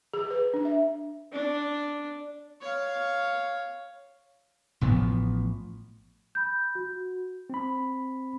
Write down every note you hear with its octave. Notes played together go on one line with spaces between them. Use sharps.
G#4
B4
D4
E5
D4
C#5 F5
A1 A2 F3 B3
B5 G6
F#4
C4 B5